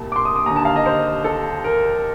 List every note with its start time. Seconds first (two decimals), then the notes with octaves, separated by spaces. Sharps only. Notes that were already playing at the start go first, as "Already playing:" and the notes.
Already playing: C2 A#2 A5
0.12 D6
0.16 C6
0.25 D#6
0.36 D#6
0.46 D#2 D3 A#5
0.56 A5
0.65 F5
0.76 D#5
0.86 C5
1.24 A4
1.64 A#4